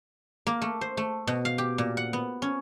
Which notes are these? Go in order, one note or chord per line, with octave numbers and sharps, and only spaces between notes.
A#3
A3
C5
A3
B2
F5
G4
A#2
F#5
B3
C#4